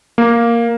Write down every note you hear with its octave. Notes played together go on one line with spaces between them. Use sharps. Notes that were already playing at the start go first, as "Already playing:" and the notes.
A#3